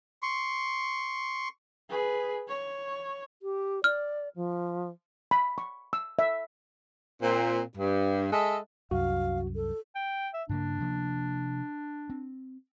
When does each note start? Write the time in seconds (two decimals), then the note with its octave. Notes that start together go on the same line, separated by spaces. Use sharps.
0.23 C6 C#6
1.90 G#4 B4
2.48 C#5
3.42 G4
3.84 D5 F6
4.36 F3
5.31 B5
5.58 C#6
5.93 E6
6.19 E5
7.23 A#2 C4
7.78 G2
8.33 G#3 A4 D#5 E5
8.91 C2 F#2 F#4 F5
9.55 A4
9.95 G5
10.34 E5
10.49 G2 C#3 A#3 D4
10.80 C3 F3 A#3
12.10 C4